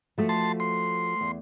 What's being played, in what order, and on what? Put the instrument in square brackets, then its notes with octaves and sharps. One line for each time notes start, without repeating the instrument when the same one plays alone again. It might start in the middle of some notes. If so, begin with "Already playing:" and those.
[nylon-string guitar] F3 A3 F#4
[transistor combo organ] A5 C6
C6
[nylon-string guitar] E2